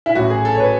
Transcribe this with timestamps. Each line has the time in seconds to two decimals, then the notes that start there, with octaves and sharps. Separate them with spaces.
0.06 E4
0.15 A1 A2 F#3 F#4
0.30 G#4
0.45 A4
0.55 C#5
0.60 B4